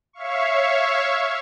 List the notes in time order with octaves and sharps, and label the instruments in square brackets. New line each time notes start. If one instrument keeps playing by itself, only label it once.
[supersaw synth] C#5 E5 F5 C#6